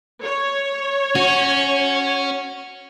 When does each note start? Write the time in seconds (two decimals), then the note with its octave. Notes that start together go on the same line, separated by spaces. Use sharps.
0.23 C#5
1.15 C#4 F#4